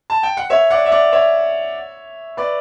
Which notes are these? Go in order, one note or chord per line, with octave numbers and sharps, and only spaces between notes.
A5
G5
F#5
C#5 E5
D5 F#5
E5
D5 F#5
C#5 E5
B4 D5